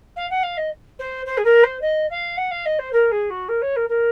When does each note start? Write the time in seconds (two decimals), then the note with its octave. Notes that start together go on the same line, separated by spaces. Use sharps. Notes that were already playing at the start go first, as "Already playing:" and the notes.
0.16 F5
0.30 F#5
0.42 F5
0.57 D#5
0.99 C5
1.26 C5
1.37 G#4
1.44 A#4
1.63 C5
1.81 D#5
2.10 F5
2.37 F#5
2.51 F5
2.65 D#5
2.78 C5
2.92 A#4
3.11 G#4
3.30 F#4
3.48 A#4
3.61 C#5
3.76 A#4
3.89 A#4